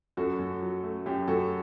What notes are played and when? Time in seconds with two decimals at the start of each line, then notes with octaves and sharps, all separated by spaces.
0.17 F#2 F#4 A4
0.39 F#2
0.62 F#3
0.83 A3
1.06 F#2 G4
1.28 F#2 F#4 A4